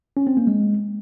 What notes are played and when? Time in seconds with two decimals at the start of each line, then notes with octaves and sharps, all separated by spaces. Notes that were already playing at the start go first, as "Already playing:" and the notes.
0.17 C#4
0.27 C4
0.37 A#3
0.47 G#3